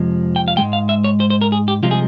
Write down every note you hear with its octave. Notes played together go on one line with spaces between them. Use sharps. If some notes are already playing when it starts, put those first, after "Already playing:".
Already playing: F2 C3 F3 G#3
G5
F5
G#2 E3 G#3 G5
F5
E5
C#5
C5
C5
A#4
G#4
G4
C2 C3 F3 G#3 F4
G#4